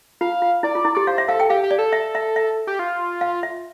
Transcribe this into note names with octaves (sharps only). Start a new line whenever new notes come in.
F4 F5
F4
E4 D5
F4
E4
G4 D5
C5 F5
E5
A4 F5
G5
G4 F5
G4
D5
A4
E5
E5
E5
G4
F4
F5
E5